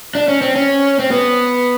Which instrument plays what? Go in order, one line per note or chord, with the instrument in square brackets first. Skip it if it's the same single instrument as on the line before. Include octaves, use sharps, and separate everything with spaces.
[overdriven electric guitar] D4
C#4
C4
C#4
C4
B3